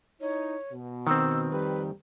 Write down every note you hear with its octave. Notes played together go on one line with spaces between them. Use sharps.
D#4 E4 C#5
B2
D#3 C4 E6
F2 G3 B4